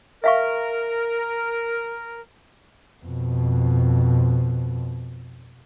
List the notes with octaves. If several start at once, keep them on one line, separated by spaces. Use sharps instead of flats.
A#4 E5 F5 C#6
F2 B2